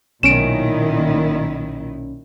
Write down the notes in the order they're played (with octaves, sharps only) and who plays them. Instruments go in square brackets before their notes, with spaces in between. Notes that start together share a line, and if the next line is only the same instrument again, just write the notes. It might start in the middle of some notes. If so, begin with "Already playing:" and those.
[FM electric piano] B1 C#4 [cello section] A#2 D#3 E4 [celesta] D7 E7